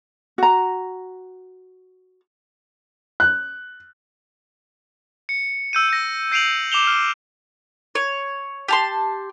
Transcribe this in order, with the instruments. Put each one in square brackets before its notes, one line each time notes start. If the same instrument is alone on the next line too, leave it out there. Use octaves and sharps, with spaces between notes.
[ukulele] F#4 A#5
[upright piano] F#6
[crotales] C#7
E6 G6 D#7
E6 A#6
G6 C7 D7 D#7 F7 F#7
D6 E7 F7 G7
F6
[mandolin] C#5
G4 A5 C6